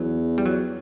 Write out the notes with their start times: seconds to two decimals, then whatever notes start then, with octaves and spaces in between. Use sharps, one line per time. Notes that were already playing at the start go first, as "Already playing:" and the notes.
Already playing: E2 F#3
0.38 G3
0.46 F#3